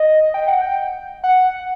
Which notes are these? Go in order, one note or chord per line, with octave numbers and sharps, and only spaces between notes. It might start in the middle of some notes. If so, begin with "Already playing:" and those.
Already playing: D#5
G5
F#5
G5
F#5